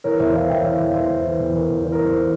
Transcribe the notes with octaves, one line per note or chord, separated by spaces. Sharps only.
E3 A#4 C#5
E2 C5 E5
E3 C#5 F5
E2 E5 G5
E3 C#5 F5
E2
E3 C5 E5
E2
E3
E2
E3 A#4
E2
E3 C5
A#4
E2 C5
E3